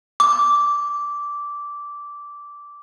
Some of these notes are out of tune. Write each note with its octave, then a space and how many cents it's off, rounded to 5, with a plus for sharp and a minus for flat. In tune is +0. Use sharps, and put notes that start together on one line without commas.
D6 -10